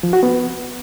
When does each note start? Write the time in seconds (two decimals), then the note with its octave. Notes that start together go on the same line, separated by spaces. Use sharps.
0.03 F3
0.13 F#4
0.23 B3